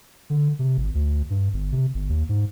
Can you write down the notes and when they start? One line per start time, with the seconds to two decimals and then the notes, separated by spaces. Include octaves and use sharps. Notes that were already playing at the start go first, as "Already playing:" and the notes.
0.30 D3
0.59 C3
0.78 G#1
0.94 D2
1.30 G2
1.53 G1
1.72 C3
1.94 G1
2.09 D#2
2.29 G#2